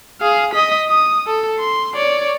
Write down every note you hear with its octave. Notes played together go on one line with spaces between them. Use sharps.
G#4 F5
D#5 B6
D#6
A4
C6
C#5 D5